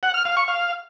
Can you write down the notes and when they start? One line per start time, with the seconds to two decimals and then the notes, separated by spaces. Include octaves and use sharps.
0.03 F#5
0.14 F6
0.25 F5
0.37 C#6
0.48 F5